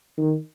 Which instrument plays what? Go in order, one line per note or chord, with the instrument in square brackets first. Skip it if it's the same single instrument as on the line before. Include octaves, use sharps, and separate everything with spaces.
[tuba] D#3